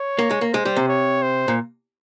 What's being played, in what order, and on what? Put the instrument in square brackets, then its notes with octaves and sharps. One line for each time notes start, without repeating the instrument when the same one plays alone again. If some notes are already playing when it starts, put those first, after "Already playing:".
Already playing: [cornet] C#5
[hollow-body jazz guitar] A#3
G#3
A#3
[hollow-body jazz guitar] G#3 [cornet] C5
[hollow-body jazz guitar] G3
C3
[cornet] C#5
C5
[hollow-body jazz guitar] A#2